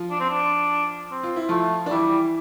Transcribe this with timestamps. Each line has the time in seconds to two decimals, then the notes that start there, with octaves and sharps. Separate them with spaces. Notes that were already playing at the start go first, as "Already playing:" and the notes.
Already playing: F3 F4
0.10 D4
0.20 C4
0.30 D4
1.11 C4
1.23 F4
1.36 E4
1.49 F3 A3 F4
1.86 D4
1.90 E3 G3 E4